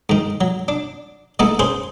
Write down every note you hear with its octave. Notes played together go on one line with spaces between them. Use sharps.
G#2 D#3
F#3
D4
G#3 A3 B3 D#4 E4
C#4 G#4 B4 C5